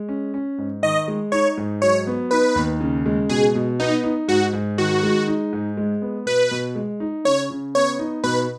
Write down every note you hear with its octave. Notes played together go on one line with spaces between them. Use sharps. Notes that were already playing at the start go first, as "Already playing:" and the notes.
Already playing: G#3
C#4
C#4
G#2
D#3 D#5
G#3
D#4 C#5
G#2
F#3 C#5
B3
D#4 B4
D#2
C#3
G#3
B2 G#4
B2
B3 D#4
D#4
G#2 F#4
G#2
D#3 F#4
G#3
D#4
G#2
G#3
B3
B2 B4
B2
G#3
D#4
C#3 C#5
C#3
B3 C#5
D#4
B2 B4